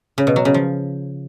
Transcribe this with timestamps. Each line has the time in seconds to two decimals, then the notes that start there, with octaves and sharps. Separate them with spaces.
0.18 C#3
0.27 B2
0.36 F#3
0.45 C#3
0.54 F3